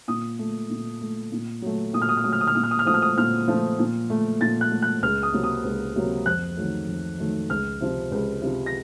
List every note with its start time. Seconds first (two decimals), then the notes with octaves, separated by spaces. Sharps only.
0.08 A#2 D#6
0.39 A3
0.70 A#2
1.01 A3
1.32 A#2
1.62 F#3 A3
1.93 A#2 D#6
2.02 F6
2.09 D#6
2.17 F6
2.24 F#3 A3 D#6
2.32 F6
2.41 D#6
2.47 F6
2.55 A#2 D#6
2.63 F6
2.71 D#6
2.79 F6
2.86 F3 A3 D#6
2.94 F6
3.02 D#6
3.17 A#2 F6
3.48 F3 A3
3.79 A#2
4.10 A3
4.41 A#2 A6
4.61 F#6
4.72 A3
4.82 F#6
5.03 C#2 F6
5.23 D#6
5.33 C3 F#3 A#3
5.44 D#6
5.64 C#2
5.96 C3 F#3 A#3
6.26 F2 F#6
6.57 D#3 F#3 A3
6.89 F2
7.19 D#3 F#3 A3
7.50 C#2 F6
7.80 C3 F3
8.12 C#2
8.42 C3 F3
8.66 A#6